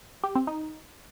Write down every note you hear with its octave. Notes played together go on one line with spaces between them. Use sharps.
G4
C4
D#4